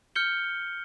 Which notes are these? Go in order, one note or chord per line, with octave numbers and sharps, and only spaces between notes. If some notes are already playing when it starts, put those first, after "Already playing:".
F6 G6 C#7 G7